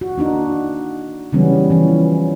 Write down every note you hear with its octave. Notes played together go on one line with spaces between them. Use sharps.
F#4
A#3 D4 D#4 F#4
C#3 E3 F#3 G3 B3 C#4
E3 F3 C#4